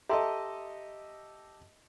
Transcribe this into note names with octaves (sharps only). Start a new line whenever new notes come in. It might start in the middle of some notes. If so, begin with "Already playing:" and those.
G4 A4 D#5 E5 A#5 C6